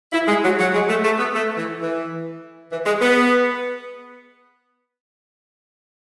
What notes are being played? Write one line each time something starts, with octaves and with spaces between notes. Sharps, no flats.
E4
G#3
F#3
F#3
G#3
A3
A3
B3
A3
E3
E3
E3
G#3
B3